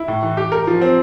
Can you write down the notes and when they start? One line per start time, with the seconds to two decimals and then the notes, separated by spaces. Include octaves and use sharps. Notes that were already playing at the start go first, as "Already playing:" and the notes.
Already playing: E4
0.08 A2
0.23 E3
0.37 G4
0.52 A#4
0.67 F3
0.82 C4